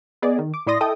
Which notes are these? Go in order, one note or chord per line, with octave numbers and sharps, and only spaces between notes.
B3 G#4 D5 D#5
D#3
D6
A2 E4 D5 C6 D#6 A#6
E4 A4 D#5 G5 D#6